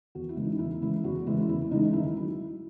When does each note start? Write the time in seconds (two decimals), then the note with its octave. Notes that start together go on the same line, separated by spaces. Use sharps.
0.15 E2 F#4
0.29 E4
0.37 C#3 E3 G#3
0.45 D#4
0.59 E2 E4
0.81 C#3 E3 G#3 E4
1.04 E2 F#4
1.27 C#3 E3 G#3 E4
1.48 E2 E4
1.71 C#3 E3 G#3 D#4
1.93 D#2 E4
2.16 D#3 F#3 E4